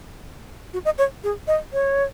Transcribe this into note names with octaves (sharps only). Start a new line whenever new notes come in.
F#4
D#5
C#5
G#4
D#5
C#5